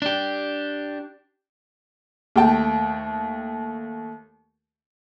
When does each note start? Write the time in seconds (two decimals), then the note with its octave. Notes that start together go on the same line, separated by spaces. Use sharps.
0.02 D4 G4
2.36 D#2 A3 G5 A5